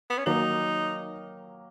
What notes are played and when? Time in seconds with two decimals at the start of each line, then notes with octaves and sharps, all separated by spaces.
0.10 B3
0.18 C#4
0.26 D#3 F#3 A#3 D#4